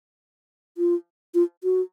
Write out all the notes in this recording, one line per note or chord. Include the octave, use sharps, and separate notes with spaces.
F4
F4
F#4